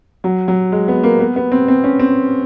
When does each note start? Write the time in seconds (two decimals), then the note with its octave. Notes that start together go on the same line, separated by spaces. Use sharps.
0.24 F#3
0.48 F#3
0.72 G#3
0.88 B3
1.04 A#3
1.19 B3
1.36 B3
1.52 C4
1.68 C4
1.84 C#4
1.99 C4